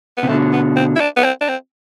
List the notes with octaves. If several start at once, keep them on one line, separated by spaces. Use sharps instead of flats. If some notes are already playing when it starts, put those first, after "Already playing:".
B3
C3
B2 D3 A3
B3
C4
E4
D4
B3
C4
D4
C4